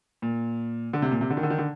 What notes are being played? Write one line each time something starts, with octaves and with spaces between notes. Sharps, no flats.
A#2
D3
C3
A#2
C3
D3
D#3
D3
D#3
D3